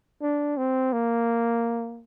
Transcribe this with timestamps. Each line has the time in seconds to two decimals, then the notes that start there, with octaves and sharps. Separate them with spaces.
0.22 D4
0.57 C4
0.93 A#3